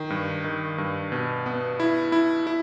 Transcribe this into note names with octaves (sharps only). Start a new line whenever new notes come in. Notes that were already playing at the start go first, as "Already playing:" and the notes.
Already playing: D#3
G2
D#3
G2
B2
B3
E4
E4
E4